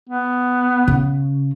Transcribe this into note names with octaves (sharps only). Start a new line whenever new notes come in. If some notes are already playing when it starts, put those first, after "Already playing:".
B3
C#3